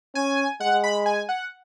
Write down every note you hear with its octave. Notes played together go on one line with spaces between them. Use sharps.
C#4 G#5
G#3 F#5
B5
G#5
F#5